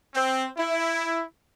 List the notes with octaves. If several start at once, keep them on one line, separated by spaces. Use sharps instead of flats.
C4
E4